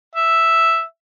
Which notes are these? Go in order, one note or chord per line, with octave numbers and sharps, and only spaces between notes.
E5